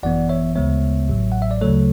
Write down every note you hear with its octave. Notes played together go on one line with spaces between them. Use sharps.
G#1 F#2 E3 B3 D5 F#5
C#5 E5
D2 C#3 G#3 B3 C#5 E5
A1 A2 F#3
F#5
E5
D5
D2 C#3 F#3 A3 A4 C#5